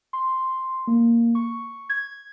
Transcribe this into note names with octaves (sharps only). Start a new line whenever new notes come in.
C6
A#3
C#6
G#6